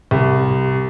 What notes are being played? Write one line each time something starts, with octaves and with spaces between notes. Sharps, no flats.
C2